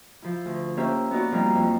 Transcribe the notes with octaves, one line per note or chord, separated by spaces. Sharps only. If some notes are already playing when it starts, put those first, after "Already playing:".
F3 E4
D2
A#3 C#4 G4 C5 E5
B3 D#4 F#4 D5
F3 G3 A#3 C4 D#4 E4
F2 F#3